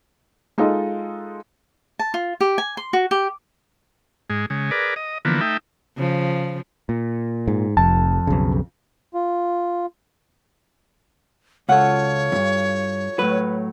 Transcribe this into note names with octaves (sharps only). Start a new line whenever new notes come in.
G#3 D#4 F4 A4 D#5
A5
F4
G4
G#5
C6
F#4
G4
G#2 G#3
C#3 G#3
G#4 A#4 B4 D5
D#5
D3 E3 F3 A#3 B3
A3 D#4 E5 G5
C#3 F3
A#2
G#2
F1 F2 A5
B1 C#3
F4
C#2 F4 F#4 A4 C#5 F#5
E2 G2
A2 F#3 B4